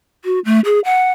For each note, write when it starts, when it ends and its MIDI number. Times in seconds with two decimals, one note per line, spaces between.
0.25 0.39 66
0.45 0.60 57
0.65 0.80 68
0.85 1.12 78